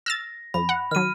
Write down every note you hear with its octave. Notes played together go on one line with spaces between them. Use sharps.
E6 F6 A6 A#6
F2 B5
F#5
D#3 F#3 F6 D#7